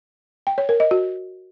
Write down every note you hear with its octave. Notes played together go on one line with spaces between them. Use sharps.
G5
C#5
A#4
D#5
F#4